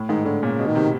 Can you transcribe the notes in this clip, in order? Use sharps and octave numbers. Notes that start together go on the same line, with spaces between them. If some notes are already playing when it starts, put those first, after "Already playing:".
Already playing: A2
G#2 D#3
A2 D3
A#2 C#3
B2
D#3
C3